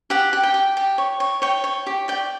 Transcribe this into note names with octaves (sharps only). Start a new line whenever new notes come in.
G4 F#5
G4
G5
G4
G4
C#5
C#5
C#5 G5
C#5
G4
D5 G5